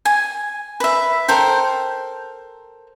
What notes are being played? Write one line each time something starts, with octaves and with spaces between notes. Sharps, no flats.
G#5
B4 E5
A4 A#4 C5 G5